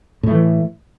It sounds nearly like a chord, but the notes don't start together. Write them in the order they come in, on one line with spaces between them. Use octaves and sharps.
A2 A3 E3